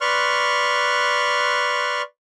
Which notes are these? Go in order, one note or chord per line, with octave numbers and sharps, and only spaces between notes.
B4 D5 C6 C#6 F6 F#6